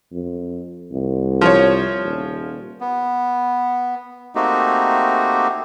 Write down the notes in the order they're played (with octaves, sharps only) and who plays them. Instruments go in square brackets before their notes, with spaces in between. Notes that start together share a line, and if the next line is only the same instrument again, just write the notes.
[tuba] F2
C2
[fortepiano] F3 C#5
[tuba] D#1
[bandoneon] B3
A3 A#3 C4 D#4 F#4 G4